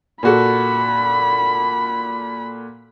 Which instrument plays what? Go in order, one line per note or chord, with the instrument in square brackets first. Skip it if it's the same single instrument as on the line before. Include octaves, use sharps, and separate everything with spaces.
[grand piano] A#2 F#4 A4 [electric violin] B5